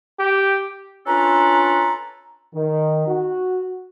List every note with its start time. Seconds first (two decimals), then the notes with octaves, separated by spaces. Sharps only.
0.19 G4
1.07 C#4 D4 F4 A4 B4 A#5
2.54 D#3
3.08 F#4